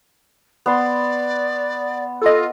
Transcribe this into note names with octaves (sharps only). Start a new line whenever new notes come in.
B3 D5 C6
F4 A4 D#5